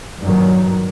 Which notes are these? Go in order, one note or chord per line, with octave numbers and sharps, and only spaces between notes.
G2 A#2 D#3 F#3